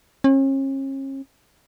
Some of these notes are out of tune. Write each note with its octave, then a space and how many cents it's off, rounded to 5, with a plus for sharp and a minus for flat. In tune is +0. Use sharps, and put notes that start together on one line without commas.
C#4 -40